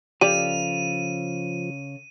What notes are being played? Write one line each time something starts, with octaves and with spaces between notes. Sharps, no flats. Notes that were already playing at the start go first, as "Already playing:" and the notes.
C#3 F3 G4 A4 D5 F5 D#7